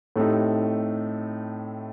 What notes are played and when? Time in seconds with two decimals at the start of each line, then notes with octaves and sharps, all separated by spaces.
0.16 A2 A3 C4 D#4 G4